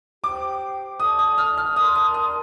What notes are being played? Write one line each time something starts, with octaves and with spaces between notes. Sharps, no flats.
G4 C5 G5 D6
A4 D5 A5 D#6
D#6
F6
F6
A#4 D5 A5 C6 D#6
D#6
D#6